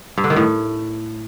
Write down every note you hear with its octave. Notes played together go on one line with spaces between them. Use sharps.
G2
D3
D#3
A2